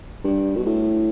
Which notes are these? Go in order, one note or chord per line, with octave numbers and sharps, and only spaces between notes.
G2
B2
A2